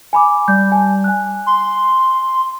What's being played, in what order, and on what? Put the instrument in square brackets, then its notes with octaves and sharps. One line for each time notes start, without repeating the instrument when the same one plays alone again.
[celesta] G#5 B5 D6
[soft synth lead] G3 [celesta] G6
[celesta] G#5 A5
G#5 F#6
[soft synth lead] C6